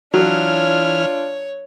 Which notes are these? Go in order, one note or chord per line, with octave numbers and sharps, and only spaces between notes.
E3 F#3 D4 F4 C#5 F6